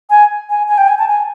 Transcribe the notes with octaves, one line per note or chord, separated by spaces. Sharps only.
G#5
G#5
G#5
G5
G#5
A5
G#5